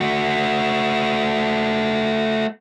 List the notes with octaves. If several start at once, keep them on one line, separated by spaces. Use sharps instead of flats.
A3 F#4